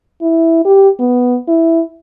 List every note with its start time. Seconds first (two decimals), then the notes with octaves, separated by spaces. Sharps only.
0.22 E4
0.65 G4
1.00 B3
1.48 E4